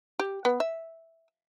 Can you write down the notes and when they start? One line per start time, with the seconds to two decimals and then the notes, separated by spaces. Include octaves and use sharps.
0.19 G4
0.45 B3
0.60 E5